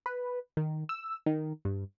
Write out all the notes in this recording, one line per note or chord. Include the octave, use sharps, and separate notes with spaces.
B4
D#3
E6
D#3
G2